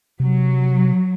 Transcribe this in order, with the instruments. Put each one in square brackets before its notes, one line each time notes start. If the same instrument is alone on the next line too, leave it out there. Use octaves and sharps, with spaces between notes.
[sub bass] C3 [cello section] F#3